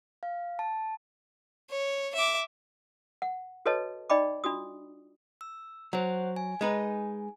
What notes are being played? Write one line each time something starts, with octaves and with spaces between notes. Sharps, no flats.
F5
A5
C#5
E5 D6
F#5
F#4 A4 B4 C#5 D#5 A5
D#4 D5 D#5 G5 B5 D6
D4 F4 F#4 D#6
E6
F#3 C5 C#5 F#5
G#5
G#3 D#4 B4